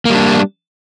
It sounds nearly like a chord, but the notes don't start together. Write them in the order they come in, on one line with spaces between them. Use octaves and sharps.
A#3 G3 D4